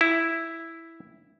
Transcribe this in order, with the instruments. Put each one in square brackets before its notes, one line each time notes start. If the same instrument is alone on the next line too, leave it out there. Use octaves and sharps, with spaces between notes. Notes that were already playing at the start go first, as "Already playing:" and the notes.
[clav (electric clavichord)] E4